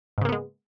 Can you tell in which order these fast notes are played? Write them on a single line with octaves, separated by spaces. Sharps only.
G#2 C#3 A#3 B3 G#3